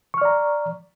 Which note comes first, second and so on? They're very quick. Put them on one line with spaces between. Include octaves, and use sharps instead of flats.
C#6 F6 D5 A#5